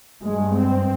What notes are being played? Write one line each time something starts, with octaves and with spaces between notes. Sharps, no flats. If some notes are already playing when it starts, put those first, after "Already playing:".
G2 G#3
C4